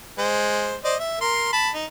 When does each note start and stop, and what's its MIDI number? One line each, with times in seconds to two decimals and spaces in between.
0.18 0.76 56
0.18 0.76 72
0.84 0.95 72
0.84 0.95 74
0.84 0.95 75
0.99 1.18 76
1.21 1.48 70
1.21 1.48 84
1.52 1.70 81
1.52 1.70 83
1.73 1.85 63